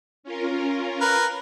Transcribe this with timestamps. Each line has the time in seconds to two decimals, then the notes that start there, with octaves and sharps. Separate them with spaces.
0.23 C#4 F4 A#4
1.01 A#4 B4